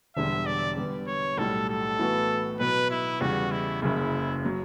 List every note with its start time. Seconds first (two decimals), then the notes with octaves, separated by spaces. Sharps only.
0.16 E1 E2 D3 G3 E5
0.46 D5
0.77 D3 G3 B3
1.07 C#5
1.37 B1 A2 G3 A4
1.69 A4
1.99 A2 E3 B3 F#4
2.59 B2 F#3 B3 B4
2.90 E4
3.21 E2 C#3 G3 F#4
3.51 E4
3.82 F#1 F#2 C#3 E4
4.45 F#3